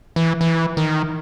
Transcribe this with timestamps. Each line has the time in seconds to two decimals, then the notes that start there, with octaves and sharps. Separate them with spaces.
0.16 E3
0.41 E3
0.77 D#3